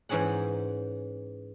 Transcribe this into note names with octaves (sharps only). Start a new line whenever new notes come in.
G#2 E3 C#4 G#4 F#5